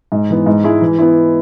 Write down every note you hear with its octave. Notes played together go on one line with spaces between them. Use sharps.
G#2
E3 B3
G#2
G#3 E4 G#4
E3
B3 E4